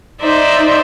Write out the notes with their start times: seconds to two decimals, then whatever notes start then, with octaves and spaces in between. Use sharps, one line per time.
0.22 D#4 C5 D5 E5